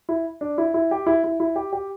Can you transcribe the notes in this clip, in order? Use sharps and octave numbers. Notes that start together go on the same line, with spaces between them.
E4
D4
E4
E4
G4
E4
E4
E4
G4
G4